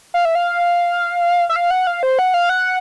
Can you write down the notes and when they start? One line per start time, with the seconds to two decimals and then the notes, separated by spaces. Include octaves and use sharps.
0.14 F5
0.25 E5
0.35 F5
1.49 E5
1.56 F5
1.70 F#5
1.87 F5
2.03 C5
2.19 F#5
2.34 F5
2.49 F#5